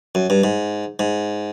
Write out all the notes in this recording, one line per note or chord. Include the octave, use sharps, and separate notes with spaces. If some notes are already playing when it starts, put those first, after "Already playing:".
F#2
G2
G#2
G#2